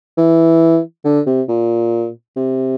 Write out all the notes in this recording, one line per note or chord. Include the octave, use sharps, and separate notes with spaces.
E3
D3
C3
A#2
C3